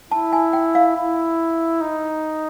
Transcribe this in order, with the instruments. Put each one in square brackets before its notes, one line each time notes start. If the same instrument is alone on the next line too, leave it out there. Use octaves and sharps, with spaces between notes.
[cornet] E4 [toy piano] A5
[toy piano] G#5
G5
F5
[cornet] E4
D#4